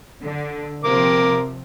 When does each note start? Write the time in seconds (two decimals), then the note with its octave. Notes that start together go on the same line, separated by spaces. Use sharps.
0.22 D3
0.84 C3 F3 A#4 D6